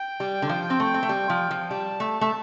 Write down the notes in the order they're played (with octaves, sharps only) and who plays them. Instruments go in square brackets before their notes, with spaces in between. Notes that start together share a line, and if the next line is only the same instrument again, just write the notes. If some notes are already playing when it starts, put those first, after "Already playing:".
Already playing: [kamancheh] G5
[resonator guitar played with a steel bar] G3
D3
F3
C4
A3
C4
A3
G3
F3
F3
[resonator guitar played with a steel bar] G3 [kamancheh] A5
[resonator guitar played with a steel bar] A3
A3